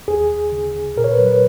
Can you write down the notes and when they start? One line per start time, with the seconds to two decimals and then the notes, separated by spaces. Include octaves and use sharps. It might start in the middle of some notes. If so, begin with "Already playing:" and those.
0.08 D#2 G#4
0.29 D#2
0.52 C#3
0.74 C#3
0.96 A#2 A#4
1.04 C#5
1.11 B4
1.19 F#3
1.27 B4